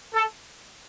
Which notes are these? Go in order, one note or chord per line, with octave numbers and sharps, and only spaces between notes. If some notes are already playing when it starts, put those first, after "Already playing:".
A4